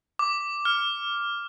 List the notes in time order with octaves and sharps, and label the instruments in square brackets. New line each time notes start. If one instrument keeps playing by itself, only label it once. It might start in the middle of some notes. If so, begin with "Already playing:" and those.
[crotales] D6
F6